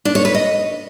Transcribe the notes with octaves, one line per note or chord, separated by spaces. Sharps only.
D4
C#5
B4
D#5